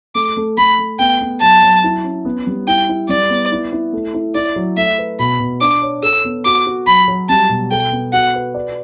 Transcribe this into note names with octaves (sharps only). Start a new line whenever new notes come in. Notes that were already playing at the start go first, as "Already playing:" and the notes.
A3 D6
A3
A3 B5
A3
B3 G5
B3
F#3 A5
F#3
E4
C#4
B3
G3
E4 G5
E4
G3 D5
B3
E4
E4
A3
E4
E4 D5
F#3
A3 E5
B4
B2 B5
B2
D4 D6
C#5
A4 E6
B3
F#4 D6
F#4
F#3 B5
F#3
G3 A5
B2
A4 G5
B3
F#4 F#5
B4
D5